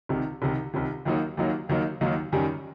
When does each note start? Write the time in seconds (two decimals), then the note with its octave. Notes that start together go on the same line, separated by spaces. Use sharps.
0.09 C2 C3 D#3
0.42 C2 C3 D#3
0.74 C2 C3 D#3
1.05 D#2 D#3 F#3 A#3 D#4
1.37 D#2 D#3 F#3 A#3 D#4
1.69 D#2 D#3 F#3 A#3 D#4
2.01 D#2 D#3 F#3 A#3 D#4
2.32 F#2 D#3 G3